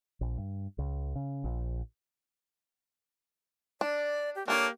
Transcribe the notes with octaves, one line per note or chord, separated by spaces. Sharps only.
A#1
G2
C#2
C#3
A#1
D4 D5
G4
A#3 D4 G4 A4 C#5